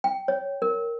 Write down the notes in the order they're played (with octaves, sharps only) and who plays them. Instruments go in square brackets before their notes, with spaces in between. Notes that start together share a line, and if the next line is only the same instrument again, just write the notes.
[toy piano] G5
C#5
A#4